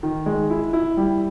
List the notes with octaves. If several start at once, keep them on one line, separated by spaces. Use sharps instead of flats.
D#3
G#3
E4
E4
G3